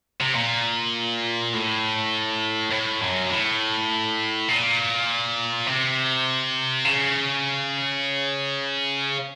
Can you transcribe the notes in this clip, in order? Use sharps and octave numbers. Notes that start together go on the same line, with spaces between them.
C3
A#2
A2
A2
F#2
A2
A#2
C3
C#3